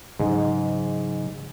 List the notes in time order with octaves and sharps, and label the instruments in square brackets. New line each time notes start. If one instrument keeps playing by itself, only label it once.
[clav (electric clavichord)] G#2 [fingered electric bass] C#3 E3 F#3